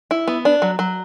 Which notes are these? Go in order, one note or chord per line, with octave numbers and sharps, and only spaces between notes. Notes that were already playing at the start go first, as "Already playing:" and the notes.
E4
B3
D4
F#3
F#3